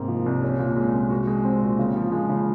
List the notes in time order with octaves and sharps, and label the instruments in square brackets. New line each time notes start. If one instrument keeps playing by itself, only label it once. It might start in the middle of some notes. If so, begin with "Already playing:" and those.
Already playing: [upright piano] G#2 C3 A#3
F3
C2
C#4
A#2
G#3
C2
F#4
G#3
C4
A#2
C#3
F3
G#3
C#3